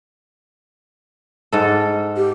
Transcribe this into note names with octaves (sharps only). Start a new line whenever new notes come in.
G#2 A4
G4